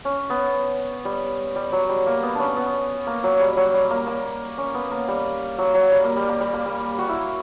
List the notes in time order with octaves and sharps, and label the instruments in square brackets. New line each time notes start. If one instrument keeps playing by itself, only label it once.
[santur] C#4
B3
G3
G3
F#3
G3
A#3
B3
C#4 D4
B3
A#3
F#3
G3
F#3
G3
A#3
A#3
C#4
B3
A#3
G3
F#3
F#3
G3
A#3
G3
A#3
G3
A#3
G3
F#4
E4